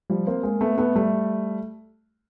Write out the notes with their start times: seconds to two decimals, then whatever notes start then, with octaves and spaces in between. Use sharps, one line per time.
0.10 F3 G3
0.27 A#3 C4
0.43 G#3 A#3
0.61 A3 B3
0.78 A3 B3
0.96 G3 A3